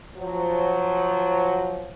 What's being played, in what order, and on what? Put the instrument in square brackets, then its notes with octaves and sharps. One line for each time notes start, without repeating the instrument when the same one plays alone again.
[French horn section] F3 F#3